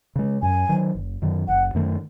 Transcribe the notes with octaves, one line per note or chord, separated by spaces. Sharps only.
C#3 G#3
F#2 G#5
D#3 F#3
F#1
F#2 D#3
F#1 F#5
F#2 D#3 A3